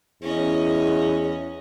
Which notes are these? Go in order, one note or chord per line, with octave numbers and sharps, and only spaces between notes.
E2 C#4 D#5